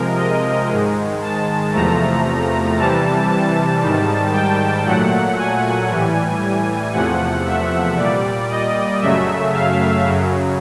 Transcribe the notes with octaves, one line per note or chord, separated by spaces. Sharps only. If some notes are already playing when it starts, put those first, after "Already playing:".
Already playing: C3 F3 G#3 A#4
D#5
G#2 D#3 G#3
A5
E2 C3 F3 A3 A#5
C3 E3 G3 A5
A5
G#2 D#3 G3
G5
A#2 F#3 A3 F#5
G#5
A2 E3 G3
E2 C3 F3 A3 F#5
E5
A#2 G3 D5
D#5
F#2 C#3 F#3 A3 E5
F5
F#2 C#3 F#3